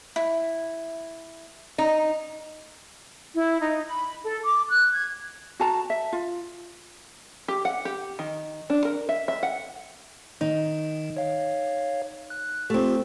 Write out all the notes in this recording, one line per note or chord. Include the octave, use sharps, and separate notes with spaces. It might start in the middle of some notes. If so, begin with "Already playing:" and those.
E4
D#4
E4
D#4
B5
A4
D6
F#6
G#6
F#4 A5 A#5
E5
F4
G4
F#5
G4
D#3
D4
A#4
E5
E5
F#5
D#3 D#4
C#5 F5
F#6
A3 C4 F4 G4